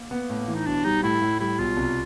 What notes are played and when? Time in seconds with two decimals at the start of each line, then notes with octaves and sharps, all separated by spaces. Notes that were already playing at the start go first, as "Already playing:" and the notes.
Already playing: A#3
0.11 B3
0.30 A2
0.48 E3
0.55 D#4
0.66 B1 D4
0.85 G3 D#4
1.03 A2 E4
1.22 A2
1.40 G3 E4
1.59 B1 F4
1.77 C2